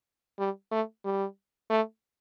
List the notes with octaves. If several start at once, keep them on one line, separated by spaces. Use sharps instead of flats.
G3
A3
G3
A3